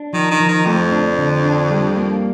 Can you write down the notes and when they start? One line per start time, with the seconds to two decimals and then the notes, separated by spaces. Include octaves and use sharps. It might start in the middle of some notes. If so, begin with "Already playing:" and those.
Already playing: D4
0.13 D#3 F3
0.31 D#3
0.40 F3
0.48 D#3
0.66 F2 A3
0.92 D4
1.18 D3
1.44 D4
1.70 G3
1.96 A#3